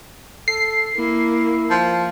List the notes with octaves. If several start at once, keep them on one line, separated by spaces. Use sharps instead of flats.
A4 C7
A#3 E4
F3